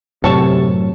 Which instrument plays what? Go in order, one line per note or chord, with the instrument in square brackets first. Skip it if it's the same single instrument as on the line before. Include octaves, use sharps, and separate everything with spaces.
[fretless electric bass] F#2 A2 F#3 [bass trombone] C3 [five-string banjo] A4 C#5 A5